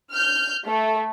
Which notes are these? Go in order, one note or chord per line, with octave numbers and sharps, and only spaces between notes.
F6 G6
A3